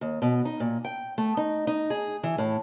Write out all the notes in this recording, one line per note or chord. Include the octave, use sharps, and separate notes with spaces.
D#2
B2
D#4
A#2
G5
A3
D#4
D#4
G#4
E3
A2